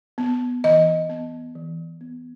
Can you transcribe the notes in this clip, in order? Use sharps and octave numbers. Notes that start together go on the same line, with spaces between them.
B3
E3 D#5
B3
E3
B3